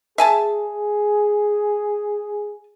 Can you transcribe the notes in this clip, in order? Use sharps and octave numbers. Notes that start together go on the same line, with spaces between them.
G#4 E5 G#5 A5